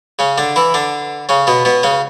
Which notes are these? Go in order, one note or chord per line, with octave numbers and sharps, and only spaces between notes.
C#3 C#4
D3 D4
E3 E4
D3 D4
C#3 C#4
B2 B3
B2 B3
C#3 C#4